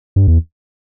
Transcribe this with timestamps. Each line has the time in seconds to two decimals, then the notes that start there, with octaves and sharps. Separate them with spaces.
0.16 G2
0.28 E2